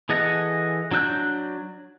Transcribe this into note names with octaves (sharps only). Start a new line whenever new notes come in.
E3 G#4 A4 D#5 F#5
F#3 D4 E6 F#6 G6